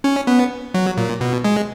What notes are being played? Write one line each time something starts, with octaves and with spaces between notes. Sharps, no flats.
C#4
B3
F#3
A#2
B2
G#3